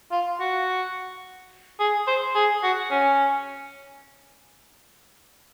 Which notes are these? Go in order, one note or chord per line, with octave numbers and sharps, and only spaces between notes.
F4
F#4
G#4
C5
G#4
F#4
C#4